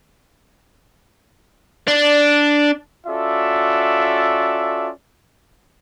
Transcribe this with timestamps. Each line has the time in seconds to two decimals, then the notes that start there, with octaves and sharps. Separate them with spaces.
1.88 D4
3.07 C#4 F4 F#4 A4 D5 E5